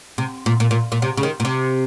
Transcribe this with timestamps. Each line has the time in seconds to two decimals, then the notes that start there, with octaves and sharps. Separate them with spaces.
0.18 C3
0.46 A#2
0.60 A#2
0.71 A#2
0.92 A#2
1.02 C3
1.17 C#3
1.23 D#3
1.40 A#2
1.45 C3